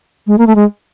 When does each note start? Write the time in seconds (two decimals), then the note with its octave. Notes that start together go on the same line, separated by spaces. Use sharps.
0.27 G#3
0.38 A#3
0.47 A3
0.56 G#3